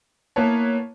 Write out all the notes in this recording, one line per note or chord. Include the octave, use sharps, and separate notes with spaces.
A#3 B3 E4 B4 C#5 A5